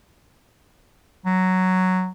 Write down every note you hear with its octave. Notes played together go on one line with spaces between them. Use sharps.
F#3